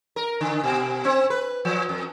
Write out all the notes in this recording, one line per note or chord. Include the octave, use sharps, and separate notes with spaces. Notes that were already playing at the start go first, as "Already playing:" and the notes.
A#4
D3
B2
C4
B4
F3
F2